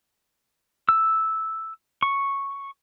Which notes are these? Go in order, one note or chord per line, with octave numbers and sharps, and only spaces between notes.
E6
C#6